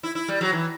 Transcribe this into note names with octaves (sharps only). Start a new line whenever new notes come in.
E4
E4
G3
F#3
E3